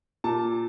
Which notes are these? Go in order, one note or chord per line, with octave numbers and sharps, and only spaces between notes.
A#2 A5